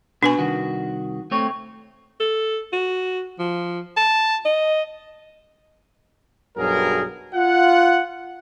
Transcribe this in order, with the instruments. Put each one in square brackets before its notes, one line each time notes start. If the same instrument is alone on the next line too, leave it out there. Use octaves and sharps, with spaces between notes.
[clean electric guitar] B2 [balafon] D4 B4 G#5
[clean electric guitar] C2 D#3 F#4
A3 C4 C#5
[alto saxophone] A4
F#4
F3
A5
D#5
[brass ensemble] B1 G2 F#3 G#4 A#4
F4 F#5